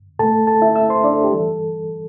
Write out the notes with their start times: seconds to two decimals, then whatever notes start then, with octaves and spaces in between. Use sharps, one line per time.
0.19 A2 A3 A4 A5
0.47 A4 A5
0.62 E4 E5
0.76 E5 E6
0.89 C5 C6
1.04 D4 D5
1.13 A4
1.24 G4
1.32 A2 E3 G3 A4